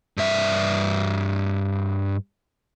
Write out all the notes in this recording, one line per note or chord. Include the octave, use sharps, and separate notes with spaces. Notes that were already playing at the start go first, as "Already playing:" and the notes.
G2 E5